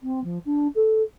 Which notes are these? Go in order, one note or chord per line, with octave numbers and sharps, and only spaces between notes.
C4
F3
D4
A4